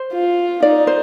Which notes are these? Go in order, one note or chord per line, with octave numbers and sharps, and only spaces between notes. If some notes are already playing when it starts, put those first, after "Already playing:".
Already playing: C5
F4
D#4 D5
C5